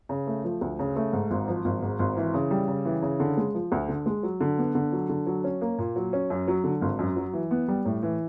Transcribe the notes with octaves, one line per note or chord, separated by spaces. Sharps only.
C#3
A3
F3
D2
C#3
A3
G#2
G#1
F3
G#1
G#2
G#1
E3
C#3
G3
C#3
E3
C#3
D3
G#3
F3
D2
D3
G#3
F#3
D3
B3
D3
F#3
D3
F#3
C#4
A#3
A#2
F#3
C#4
F#2
F#3
D3
G#1
F#2
F#3
E3
B3
G3
A2
E3